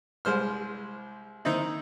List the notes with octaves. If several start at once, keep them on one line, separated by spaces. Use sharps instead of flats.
C2 G#3 C5 F6
D#3 C4 D#4 E4